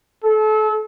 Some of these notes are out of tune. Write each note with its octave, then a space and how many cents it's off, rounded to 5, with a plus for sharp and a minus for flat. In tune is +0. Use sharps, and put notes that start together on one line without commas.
A4 -30